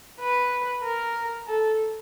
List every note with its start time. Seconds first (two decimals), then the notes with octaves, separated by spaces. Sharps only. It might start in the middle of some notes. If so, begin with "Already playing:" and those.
0.20 B4
0.83 A#4
1.47 A4